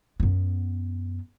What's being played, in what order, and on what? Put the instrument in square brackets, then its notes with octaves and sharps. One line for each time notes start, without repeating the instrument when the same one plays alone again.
[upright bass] F#2 B3